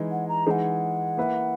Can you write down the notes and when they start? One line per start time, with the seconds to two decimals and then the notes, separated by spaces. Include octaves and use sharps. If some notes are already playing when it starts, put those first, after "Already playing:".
Already playing: E3 G#3 D#4
0.11 F#5
0.29 A#5
0.47 E3 G#3 D#4 G#4 F#5 A#5
1.17 A#3 E4 B4 E5